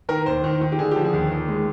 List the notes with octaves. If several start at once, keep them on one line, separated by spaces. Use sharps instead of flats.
D#3 A#4
D#2 C5
D#3
D#3
G4
D3 G#4
G4
F3
G#4
D#2
D#2
G#3